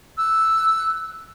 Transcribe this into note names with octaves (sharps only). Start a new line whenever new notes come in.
E6 F#6